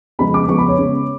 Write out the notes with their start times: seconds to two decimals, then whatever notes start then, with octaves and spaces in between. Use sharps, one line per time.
0.19 C#3 F3 G#3 B3 B5
0.34 D6
0.48 C#3 F3 G#3 B3 C#6
0.58 B5
0.68 C#5
0.78 C#3 G#3 B3